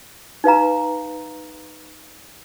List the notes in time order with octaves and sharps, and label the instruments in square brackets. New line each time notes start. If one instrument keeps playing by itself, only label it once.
[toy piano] D#4 B4 F5 A#5